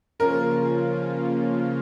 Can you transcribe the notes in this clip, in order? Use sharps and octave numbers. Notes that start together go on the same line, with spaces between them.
C#3 F3 A#3 C#4 F4 A#4